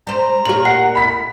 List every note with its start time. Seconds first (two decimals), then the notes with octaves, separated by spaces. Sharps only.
0.07 G3 C5 A#5
0.45 A#2 G4 A#4 F#7
0.65 F#5 C7
0.95 B5 B6